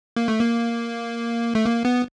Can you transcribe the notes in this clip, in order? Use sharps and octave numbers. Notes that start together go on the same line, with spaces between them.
A#3
A3
A#3
A3
A#3
B3